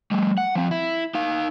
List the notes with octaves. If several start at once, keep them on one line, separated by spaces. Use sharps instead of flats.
G3 A3
F#5
F3 C4
E4
D#4 F5